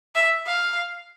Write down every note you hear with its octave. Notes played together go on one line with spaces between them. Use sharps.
E5
F5